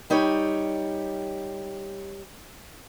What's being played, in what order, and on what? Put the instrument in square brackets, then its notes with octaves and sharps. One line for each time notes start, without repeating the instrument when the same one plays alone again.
[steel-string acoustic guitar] G3 D#4 G4 C#5